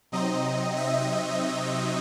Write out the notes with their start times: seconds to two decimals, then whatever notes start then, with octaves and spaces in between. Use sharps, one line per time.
0.12 C3 F#3 C4 D#4 D#5
0.77 E5